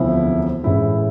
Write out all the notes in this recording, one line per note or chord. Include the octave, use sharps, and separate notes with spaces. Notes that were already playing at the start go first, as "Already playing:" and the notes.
Already playing: E1 D2 C3 F3 E4
A1 A2 E3 G#3 E4